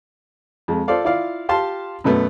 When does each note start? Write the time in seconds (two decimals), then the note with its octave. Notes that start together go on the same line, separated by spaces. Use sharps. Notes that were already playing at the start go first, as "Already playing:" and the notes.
0.68 F2 G#3
0.88 F4 A4 C5 D5 F5
1.05 E4 F4 D5 F5
1.49 F4 G4 F5 A5 C6
2.04 F#2 B2 A3 B3